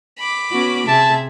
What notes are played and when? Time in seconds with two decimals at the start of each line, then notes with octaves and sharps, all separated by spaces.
0.18 B5 D6
0.51 B3 C#4 F#4
0.88 C3 G#4 E5 A5